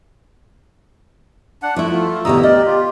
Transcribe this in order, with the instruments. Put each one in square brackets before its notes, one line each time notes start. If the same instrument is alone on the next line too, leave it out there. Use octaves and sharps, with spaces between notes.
[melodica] D4 F#5
[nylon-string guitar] F3 E4 [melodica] A3
[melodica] A3 [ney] F4
[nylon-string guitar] D2 B2 E3 [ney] G4 [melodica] A#5 D#6 E6
[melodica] A#4 D5 [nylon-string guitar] D#5
[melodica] F4